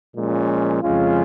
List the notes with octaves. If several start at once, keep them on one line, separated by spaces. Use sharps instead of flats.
A#2 F3 G#3 C#4
F2 C#3 G#3 C#4 F4